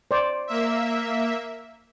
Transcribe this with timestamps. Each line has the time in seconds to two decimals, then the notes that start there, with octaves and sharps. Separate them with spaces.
0.11 C5 D5
0.47 A#3 E5